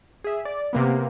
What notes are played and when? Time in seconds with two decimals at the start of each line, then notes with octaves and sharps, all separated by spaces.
0.24 G#4 E5
0.45 D5
0.73 C3 A#3 B3